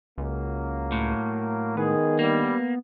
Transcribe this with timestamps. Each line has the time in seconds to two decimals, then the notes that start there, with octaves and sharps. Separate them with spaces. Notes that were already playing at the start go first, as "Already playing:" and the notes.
0.18 C#2 F#3 A#3
0.92 A2
1.77 D#3 G#3 B3 G#4
2.19 D3 G3 A#3